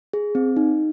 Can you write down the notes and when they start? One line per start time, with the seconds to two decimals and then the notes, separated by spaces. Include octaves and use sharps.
0.13 G#4
0.35 C4
0.57 D#4